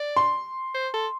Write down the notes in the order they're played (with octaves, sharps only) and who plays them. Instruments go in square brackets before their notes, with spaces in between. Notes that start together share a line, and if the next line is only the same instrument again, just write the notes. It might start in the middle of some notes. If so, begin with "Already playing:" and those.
Already playing: [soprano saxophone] D5
[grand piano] C6
[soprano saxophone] C5
A4